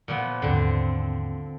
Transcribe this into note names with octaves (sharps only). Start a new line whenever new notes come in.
A#2 F3 B3
D#2 G#2 D3 C4